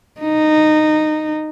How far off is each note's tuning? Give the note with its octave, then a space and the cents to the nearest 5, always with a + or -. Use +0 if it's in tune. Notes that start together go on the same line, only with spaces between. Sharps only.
D#4 -15